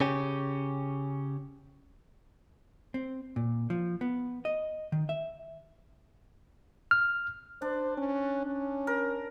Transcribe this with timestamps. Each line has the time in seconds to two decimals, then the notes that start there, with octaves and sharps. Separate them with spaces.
0.01 C#3 C#4 G4
2.94 C4
3.36 A#2
3.70 F3
4.01 B3
4.45 D#5
4.92 D#3
5.09 E5
6.91 F6
7.62 D4 C5
7.98 C#4
8.46 C#4
8.87 A#4